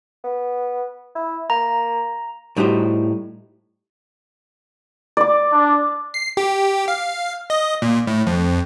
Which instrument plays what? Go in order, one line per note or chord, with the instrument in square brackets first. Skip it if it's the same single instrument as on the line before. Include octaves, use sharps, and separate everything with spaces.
[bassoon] B3
E4
[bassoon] A#3 [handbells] A#5
[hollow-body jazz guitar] A2 G3 D#4 F#4 G4 C5
[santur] D5 D6
[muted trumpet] D4
[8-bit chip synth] C7
G4
F5
D#5
A#2
A2
F2